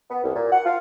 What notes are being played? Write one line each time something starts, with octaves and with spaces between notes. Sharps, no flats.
B3
C2
A#2
F#5
F4